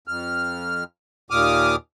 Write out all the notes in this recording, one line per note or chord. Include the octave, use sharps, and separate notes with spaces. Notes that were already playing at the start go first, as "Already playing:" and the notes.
F2 F6
D#2 A#2 D6 D#6 F6